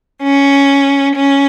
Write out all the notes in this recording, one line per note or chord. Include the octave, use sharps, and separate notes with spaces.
C#4
C#4